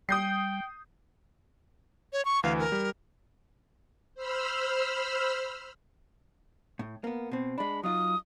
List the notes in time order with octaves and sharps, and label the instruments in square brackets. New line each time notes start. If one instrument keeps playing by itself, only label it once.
[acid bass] G3 [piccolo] G5 [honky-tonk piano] D#6 G6 C7
[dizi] C#5
C#6
[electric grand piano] D2 E3 [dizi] F5
[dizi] A#4
[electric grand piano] G3
[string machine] C5 B5 E6 F6
[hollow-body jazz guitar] A2
A#3 B3
B2 C4
[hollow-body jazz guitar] G#3 D4 [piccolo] B5
[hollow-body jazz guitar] F#3 D#4 F4 [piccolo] D#6